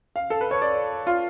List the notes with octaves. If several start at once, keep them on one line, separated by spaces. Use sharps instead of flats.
F5
A4
B4
C#5
D5
F4